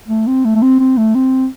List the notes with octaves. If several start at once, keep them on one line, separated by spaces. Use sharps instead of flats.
A3
C4
A3
A3
C4
C4
A3
C4